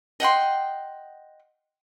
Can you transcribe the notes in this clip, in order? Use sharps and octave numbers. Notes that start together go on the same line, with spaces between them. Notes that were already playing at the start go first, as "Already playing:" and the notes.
D#5 F#5 G5 C6